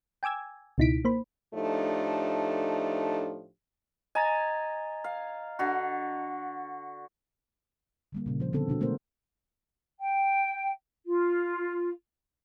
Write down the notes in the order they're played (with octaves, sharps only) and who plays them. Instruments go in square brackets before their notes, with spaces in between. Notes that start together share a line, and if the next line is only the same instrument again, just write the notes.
[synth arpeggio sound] G5 G#5 D6 E6 G#6
C#2 B2 D#4 E4 B6 D7
A#3 C5 B5
[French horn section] A2 F3 A3 D4 D#4 G4
[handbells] D#5 A#5 A6 [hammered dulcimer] G#5
[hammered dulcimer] F5
D3 F#4
[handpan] D3 G3 A#3
A#2 C#3
F3 C5
D3 B3 C4 A4
B2 D4 F#4
G#3 A3 B3 A#4 C5
[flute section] G5
F4